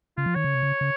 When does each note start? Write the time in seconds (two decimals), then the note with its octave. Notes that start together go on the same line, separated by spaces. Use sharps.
0.17 C#3 F4
0.26 F3
0.35 D#3 C#5
0.44 C#3
0.54 C3
0.63 C#3
0.81 C#3